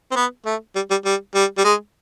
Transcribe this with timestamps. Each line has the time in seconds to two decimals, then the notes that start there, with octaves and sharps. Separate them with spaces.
0.12 C4
0.16 B3
0.46 A3
0.76 G3
0.90 G3
1.05 G3
1.35 G3
1.58 G3
1.64 G#3